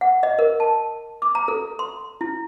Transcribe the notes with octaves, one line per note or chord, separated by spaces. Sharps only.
F#5
D#5
A#4
A5
D6
A#5
A4
C6
E4